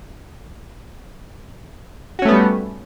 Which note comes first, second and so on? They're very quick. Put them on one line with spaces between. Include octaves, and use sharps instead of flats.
F#4 C#4 A3 B3 G3